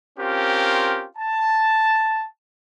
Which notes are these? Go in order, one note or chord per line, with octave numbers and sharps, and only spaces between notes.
C4 C#4 F4 G4 A#4
A5